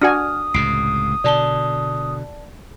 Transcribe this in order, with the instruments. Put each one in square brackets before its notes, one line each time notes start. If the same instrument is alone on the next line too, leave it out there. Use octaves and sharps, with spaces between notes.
[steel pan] D4 F#4 G#5 [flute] D#6 [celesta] F6
[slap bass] C#2 A2 C3 [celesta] C7 D7
[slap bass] B2 D3 [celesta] D5 A5 G7